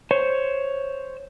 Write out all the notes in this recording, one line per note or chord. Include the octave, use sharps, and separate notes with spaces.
C5 C#5